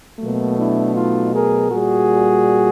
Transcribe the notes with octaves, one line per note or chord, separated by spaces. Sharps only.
B2 F#3 A3 A#3
D4 E4
D#4 F4
G#4 A#4
A#2 G3 F#4 G#4